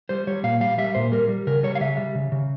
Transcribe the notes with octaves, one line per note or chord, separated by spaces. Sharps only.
G3 C5
G3 C#5
A#2 F5
G3 F5
G3 E5
A#2 C5
G3 A#4
G3
C#3 A#4
G3 C#5
F5
C#3 E5
G3
C#3
C#3